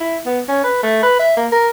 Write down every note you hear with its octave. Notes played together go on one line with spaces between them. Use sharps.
E4
B3
C#4
B4
A3
B4
E5
A#3
A#4